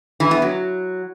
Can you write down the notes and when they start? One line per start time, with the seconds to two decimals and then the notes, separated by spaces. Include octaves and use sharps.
0.20 E3
0.31 B3
0.42 F#3